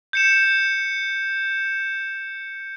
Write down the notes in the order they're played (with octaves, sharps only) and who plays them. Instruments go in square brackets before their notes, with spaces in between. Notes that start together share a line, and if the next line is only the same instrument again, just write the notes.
[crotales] G6 C#7 E7